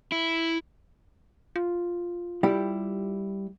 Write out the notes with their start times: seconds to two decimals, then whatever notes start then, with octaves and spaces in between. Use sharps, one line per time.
0.12 E4
1.56 F4
2.43 G3 E4 G4